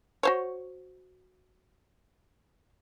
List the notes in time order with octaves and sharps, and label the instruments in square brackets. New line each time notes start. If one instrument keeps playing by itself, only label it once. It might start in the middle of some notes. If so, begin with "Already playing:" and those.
[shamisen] F#4 C5 C#5